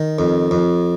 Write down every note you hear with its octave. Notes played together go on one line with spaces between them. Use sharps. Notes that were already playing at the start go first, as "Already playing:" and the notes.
Already playing: D#3
F2
F2